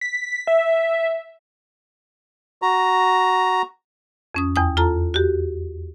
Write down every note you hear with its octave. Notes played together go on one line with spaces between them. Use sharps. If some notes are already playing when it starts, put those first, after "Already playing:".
B6
E5
F#4 A#5
F2 C#4 D#6
E2 G5 D#6
F4 A4 A5 A#5
F#4 G4